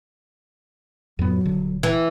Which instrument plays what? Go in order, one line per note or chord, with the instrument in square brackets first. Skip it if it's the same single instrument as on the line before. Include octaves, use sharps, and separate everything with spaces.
[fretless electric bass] F2 A2 B3 [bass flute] F#3
[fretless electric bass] D#1 D3
[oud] E3